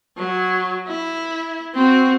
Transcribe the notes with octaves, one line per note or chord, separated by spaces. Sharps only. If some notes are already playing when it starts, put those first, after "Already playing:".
F#3
E4
C4 F#4